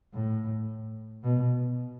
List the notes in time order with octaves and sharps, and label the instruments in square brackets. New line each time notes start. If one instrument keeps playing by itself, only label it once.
[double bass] A2
B2